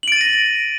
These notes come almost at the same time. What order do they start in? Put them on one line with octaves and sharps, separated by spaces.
F#7 D7 A6 D#7 A#6